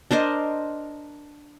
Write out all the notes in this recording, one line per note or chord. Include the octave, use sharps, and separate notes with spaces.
D4 A#4 C5 D#5